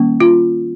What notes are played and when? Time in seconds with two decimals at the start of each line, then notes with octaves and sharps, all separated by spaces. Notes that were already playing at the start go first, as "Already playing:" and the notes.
Already playing: D#3 G3 A#3 C#4
0.20 F4